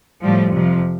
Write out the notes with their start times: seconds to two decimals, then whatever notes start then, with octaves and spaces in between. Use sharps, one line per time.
0.22 A2 F3 G3
0.51 F2 C3 F3